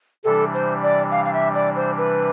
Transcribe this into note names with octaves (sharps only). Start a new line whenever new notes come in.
C3 E3 G3 D4 A4
C5
D5
F5
F5
E5
D5
C5
B4